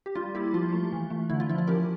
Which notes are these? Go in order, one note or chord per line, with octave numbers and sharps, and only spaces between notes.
G4
G3 F4
A#3 E4 G4
F3 F4
A3
E3
A3
D3 E4
F4
F3 E4
F4
C#4 G4 A#4